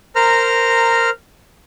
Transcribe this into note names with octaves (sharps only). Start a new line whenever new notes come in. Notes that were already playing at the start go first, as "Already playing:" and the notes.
A#4 C5 A#5 F6